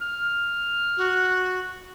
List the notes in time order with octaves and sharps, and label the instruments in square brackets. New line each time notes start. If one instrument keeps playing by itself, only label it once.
[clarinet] F6
[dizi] F#4